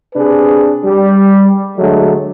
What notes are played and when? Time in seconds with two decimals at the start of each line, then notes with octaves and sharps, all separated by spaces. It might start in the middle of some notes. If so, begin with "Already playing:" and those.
0.14 C3 D4 G#4 B4
0.85 G3
1.79 D3 F#3 G#3 A3